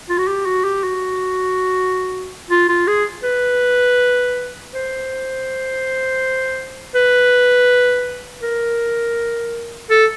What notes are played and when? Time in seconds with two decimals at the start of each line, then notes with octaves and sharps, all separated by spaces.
0.09 F4
0.18 F#4
0.28 G4
0.46 F#4
0.64 G4
0.84 F#4
2.51 F4
2.69 F4
2.88 G#4
3.24 B4
4.73 C5
6.95 B4
8.43 A#4
9.91 A4